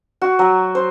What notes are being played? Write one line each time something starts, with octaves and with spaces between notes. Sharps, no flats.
F#4
F#3
C5